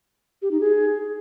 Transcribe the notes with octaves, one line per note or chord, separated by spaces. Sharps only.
G4
D#4
G#4